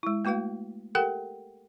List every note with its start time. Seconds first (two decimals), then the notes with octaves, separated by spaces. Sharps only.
0.03 G#3 E4
0.25 A3 A#3 F#4 B4 F5
0.95 G4 A4 A#4 F#5 G5